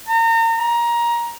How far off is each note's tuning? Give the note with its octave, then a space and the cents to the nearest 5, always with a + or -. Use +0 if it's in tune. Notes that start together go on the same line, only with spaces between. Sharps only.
A#5 -35
A#5 +20